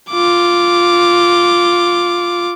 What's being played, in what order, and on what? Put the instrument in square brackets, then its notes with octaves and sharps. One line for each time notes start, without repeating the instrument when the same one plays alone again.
[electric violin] F4 D6